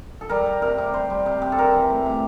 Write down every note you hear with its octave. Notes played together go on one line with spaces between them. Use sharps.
A4
G3 A#4
G3
C3 A#4
C3
G3 C5
G3
C3
C3
A4
C3 A#4
E3
A3
C3